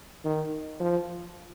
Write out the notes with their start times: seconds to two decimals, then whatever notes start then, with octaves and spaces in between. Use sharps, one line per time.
0.25 D#3
0.80 F3